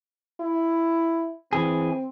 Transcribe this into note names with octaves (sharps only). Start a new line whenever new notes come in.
E4
E3 C4 G#4